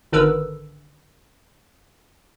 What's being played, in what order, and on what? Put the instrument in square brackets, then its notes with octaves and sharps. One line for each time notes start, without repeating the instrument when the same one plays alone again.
[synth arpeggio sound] G#1 D3 A#4 B4 E6